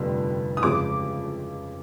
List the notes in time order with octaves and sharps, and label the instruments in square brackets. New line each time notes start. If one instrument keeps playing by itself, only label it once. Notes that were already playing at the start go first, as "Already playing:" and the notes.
Already playing: [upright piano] F1 F2 D3 G3
D#6
F2 C#3 F3 G#3 D6